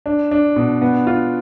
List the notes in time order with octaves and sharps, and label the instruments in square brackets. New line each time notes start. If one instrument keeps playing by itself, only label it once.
[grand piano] D4
D4
B2
B3
F4